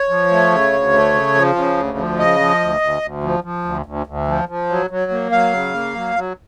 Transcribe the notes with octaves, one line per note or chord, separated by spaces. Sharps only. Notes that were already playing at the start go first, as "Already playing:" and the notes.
Already playing: C#5
F3
A3
C#3
D2
A3
C#3
F3
C#3
D2
F3
C#3 D#5
F3
D2
D2
D2
F3
F3
D2
D2
D2
F3
F3
F#3
F#3
A#3
F#3 F5
C#3
A#3
F#3
F#3